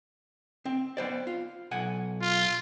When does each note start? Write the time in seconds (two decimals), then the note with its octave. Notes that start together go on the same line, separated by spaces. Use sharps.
0.65 C4
0.97 B3 C5 D5
1.27 F4
1.71 B1 F#5 G#5
2.22 F4